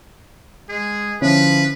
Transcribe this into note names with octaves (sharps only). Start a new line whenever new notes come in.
G#3 G#4
D3 F3 C#4 E4 B4